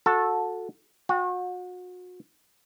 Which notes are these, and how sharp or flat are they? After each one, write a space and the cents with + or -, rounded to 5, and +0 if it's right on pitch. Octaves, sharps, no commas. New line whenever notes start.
F#4 -25 A4 +0
F#4 -35 G5 +0